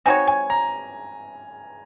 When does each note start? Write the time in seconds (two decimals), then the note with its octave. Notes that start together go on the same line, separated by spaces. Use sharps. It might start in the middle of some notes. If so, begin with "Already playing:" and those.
0.06 C4 D#4 F#4 C#5 G#5
0.28 G#5
0.50 A#5